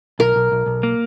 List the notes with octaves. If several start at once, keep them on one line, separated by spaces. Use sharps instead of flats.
B1 A#4
B1
B1
B1
A#3